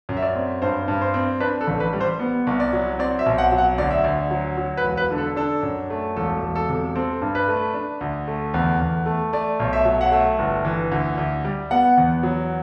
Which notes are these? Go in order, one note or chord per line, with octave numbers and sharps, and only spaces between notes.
F#2
E5
D5
C4
G2 C5
G2
C5
C4
D4 B4
A4
A1
B4
G3
C5
B3
C2
D5
F#3
C4 D5
E5
B1
F#5
F#3
F#5
D2 D5
E5
D2 D5
F#3
F#3
B4
E1
B4
D3
A4
D4 A4
F#2
A3
E1 A4
E1
A4
C3
C4 A4
G2
B4
A3
D4
D2
A3
E2
E2
A3
A3 D5
B1
E5
F#3
F#5
A3 E5
G1
E3
D2
D2
G3
B3 F#5
E2
F#3